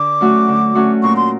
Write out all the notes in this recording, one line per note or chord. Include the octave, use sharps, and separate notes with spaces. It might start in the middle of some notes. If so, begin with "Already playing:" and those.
Already playing: D3 D6
F#3 A3 C#4 F#4
D3
F#3 A3 C#4 F#4
A#2 C#6
C6